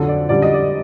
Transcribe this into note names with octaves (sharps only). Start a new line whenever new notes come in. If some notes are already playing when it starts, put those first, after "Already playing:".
Already playing: F2 D3 F#3 A4
D5
F#2 D3 G3 D5
D#5
D5